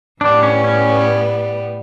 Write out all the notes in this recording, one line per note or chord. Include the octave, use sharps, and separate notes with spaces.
A2 G3 B3 D4
C#4
C#4